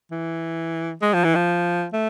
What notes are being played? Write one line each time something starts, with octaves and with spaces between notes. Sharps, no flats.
E3
G#3
F3
E3
F3
A3